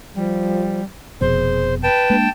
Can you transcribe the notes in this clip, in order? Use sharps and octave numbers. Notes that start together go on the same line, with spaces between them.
F3 G3
F1 F2 B2 G#4 C5
B4 G5 A5
G#3 A#3 D4